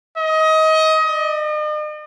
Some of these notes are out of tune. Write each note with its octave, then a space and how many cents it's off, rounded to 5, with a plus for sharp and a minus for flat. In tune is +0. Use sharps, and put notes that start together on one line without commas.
D#5 +25
D#5 -45